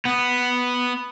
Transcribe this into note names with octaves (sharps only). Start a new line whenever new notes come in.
B3